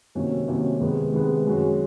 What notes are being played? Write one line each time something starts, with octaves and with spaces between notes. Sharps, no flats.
C3 D#3 F#3 A#3 C#4
C3 D#3 F#3 A#3 C#4
C3 D#3 G#3 B3
C3 D#3 G#3 B3
F#2 D#3 G#3 C#4 F#4